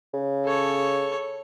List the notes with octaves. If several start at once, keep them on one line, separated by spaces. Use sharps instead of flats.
C#3
A4 C#5